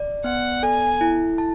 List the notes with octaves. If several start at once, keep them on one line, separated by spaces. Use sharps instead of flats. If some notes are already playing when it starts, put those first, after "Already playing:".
Already playing: D5
B3 F#5
A4 G#5
E4
A5